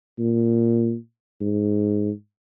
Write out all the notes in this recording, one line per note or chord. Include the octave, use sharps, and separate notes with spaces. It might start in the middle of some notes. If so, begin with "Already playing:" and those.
A#2
G#2